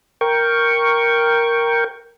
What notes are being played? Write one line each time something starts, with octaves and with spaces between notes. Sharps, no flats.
A#4 G5 C#6